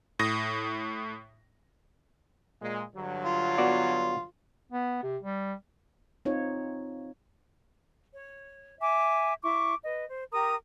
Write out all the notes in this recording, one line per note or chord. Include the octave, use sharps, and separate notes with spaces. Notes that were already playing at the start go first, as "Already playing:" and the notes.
A2 D#6 A#6
A#2 G#3
G2 D3 F#3
F4
B3 F#4 D5
B3
C3
G3
C4 D#4 F4 C#5
C#5
E5 G#5 D6
E4 C#6 D6
B4 D#5
C5
G4 A#4 A#5 D#6